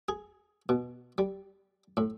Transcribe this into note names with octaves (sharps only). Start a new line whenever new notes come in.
G#4
B2
G3
A2